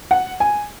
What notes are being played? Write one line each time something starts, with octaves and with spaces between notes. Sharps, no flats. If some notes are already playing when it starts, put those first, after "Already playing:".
F#5
G#5